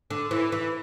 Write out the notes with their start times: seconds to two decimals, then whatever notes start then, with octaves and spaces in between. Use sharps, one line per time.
0.10 D3
0.31 E3
0.52 E3